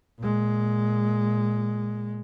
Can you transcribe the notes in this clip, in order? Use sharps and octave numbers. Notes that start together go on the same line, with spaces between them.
A#2 G#3